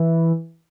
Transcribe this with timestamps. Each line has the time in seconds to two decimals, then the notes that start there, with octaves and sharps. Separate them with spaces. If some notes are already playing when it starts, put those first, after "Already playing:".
Already playing: E3